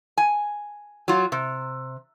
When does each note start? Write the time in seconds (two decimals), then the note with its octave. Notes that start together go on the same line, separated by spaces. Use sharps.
0.18 G#5
1.08 F#3 F4
1.32 C3